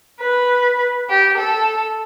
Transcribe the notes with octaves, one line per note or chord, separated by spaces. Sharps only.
B4
G4
A4